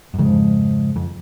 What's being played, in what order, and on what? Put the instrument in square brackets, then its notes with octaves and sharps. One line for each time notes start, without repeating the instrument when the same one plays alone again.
[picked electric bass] F#2
[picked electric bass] F2 G#2 [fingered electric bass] C#3 F3 G#3
[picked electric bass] F2